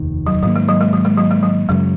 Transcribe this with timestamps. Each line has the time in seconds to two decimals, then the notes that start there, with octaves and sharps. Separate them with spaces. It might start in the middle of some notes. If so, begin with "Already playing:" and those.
Already playing: F1 D#2 D#3
0.27 F#3
0.43 G#2 D#3 F#3 A#3
0.56 G#3
0.68 F#3
0.81 G#3
0.93 F#3
1.05 G#3
1.18 F#3
1.31 G#3
1.43 F#3
1.69 F#2 C#3 F#3 G#3